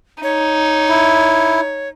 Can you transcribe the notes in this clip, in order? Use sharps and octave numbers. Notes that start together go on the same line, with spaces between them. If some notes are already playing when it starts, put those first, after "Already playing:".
D#4 C#5
E4